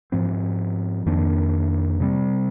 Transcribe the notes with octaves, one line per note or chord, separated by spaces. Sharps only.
G#2 F3 C4
F2 D#3 A#3 D4
C3 G3 C4